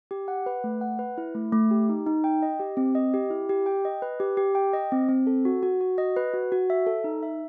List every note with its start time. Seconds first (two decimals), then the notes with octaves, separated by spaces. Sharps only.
0.11 G4
0.28 F#5
0.46 B4
0.64 A3
0.81 F#5
0.99 B4
1.18 E4
1.35 A3
1.53 A3
1.71 G4
1.89 D#4
2.06 D#4
2.24 G5
2.43 D#5
2.60 G4
2.77 C4
2.95 D#5
3.14 G4
3.30 E4
3.49 G4
3.66 G5
3.85 D#5
4.02 B4
4.20 G4
4.37 G4
4.55 G5
4.73 D#5
4.92 C4
5.09 C4
5.27 A4
5.45 F#4
5.63 F#4
5.81 F#4
5.98 D#5
6.16 B4
6.34 F#4
6.52 F#4
6.70 E5
6.86 A4
7.04 D#4
7.23 E5